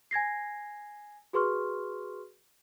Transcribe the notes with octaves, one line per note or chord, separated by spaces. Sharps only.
G#5 G#6 A#6 C7
F#4 G#4 B4 C6 C#6 F6